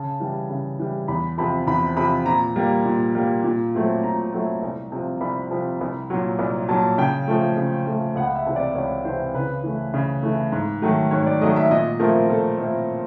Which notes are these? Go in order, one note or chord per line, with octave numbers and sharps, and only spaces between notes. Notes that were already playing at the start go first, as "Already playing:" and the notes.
Already playing: C#3 A5
E3 G3
C#3
E3 G3
E2 B5
C3 F3 B5
E2 B5
C3 F3 B5
A#2 A#5
G3 A#3
A#2
G3 A#3
A#2
F#3 A3 C4 E4
A#2 A#5
F#3 A3 C4 E4
C2
C3 F3
C2 B5
C3 F3
C2
A#2 F#3
C2
A#2 F#3 A5
C#3 G5
F3 A3
C#3
F3 A3
C#2 F#5
E5
C3 E3
D5
C#2 C#5
C3 E3 C5
C#3 B4
E3 A3
C#3
E3 A3
G#2
D#3 F#3 A3
G#2 C#5
D5
D#3 F#3 A3 D#5
E5
A#2 D#5
F3 A3 C4 E4 A#4
A#2 A4
F3 A3 C4 E4